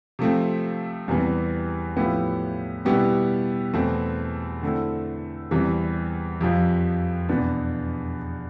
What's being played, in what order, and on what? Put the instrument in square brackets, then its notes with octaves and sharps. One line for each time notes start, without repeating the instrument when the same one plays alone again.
[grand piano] C3 F3 A3 C4
E2 C3 E3 G3 B3
A2 F3 B3 E4 G4
B2 G3 B3 E4 G4
E2 B2 A3 C4
D3 A3 C4 E4
E2 C3 E3 G3
F2 C3 F3
E2 B2 B3 D4